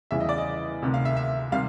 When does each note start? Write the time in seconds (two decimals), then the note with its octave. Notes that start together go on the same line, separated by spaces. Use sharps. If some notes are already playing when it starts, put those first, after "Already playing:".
0.11 E2 C#3 E3 G3 E5
0.20 D#5
0.29 D5
0.38 D#5
0.82 D2 C3 D#3
0.94 F5
1.05 E5
1.17 E5
1.52 C3 D#3 G3 F5